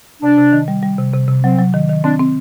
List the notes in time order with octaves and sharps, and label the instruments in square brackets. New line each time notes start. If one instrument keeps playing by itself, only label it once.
[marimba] C3 [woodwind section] D4
[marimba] C3
D#3
G3
G3
C3
C3
C3
[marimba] F#3 [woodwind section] C4
[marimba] F#3
D#3
D#3
[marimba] C4 [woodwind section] D4
[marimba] C4